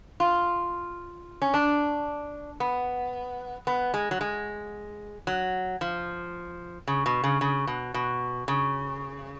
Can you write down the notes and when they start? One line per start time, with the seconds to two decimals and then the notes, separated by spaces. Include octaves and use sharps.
0.20 F4
1.42 C#4
1.54 D4
2.60 B3
3.67 B3
3.94 G#3
4.11 F#3
4.21 G#3
5.27 F#3
5.81 F3
6.88 C#3
7.06 B2
7.24 C#3
7.41 C#3
7.67 B2
7.94 B2
8.48 C#3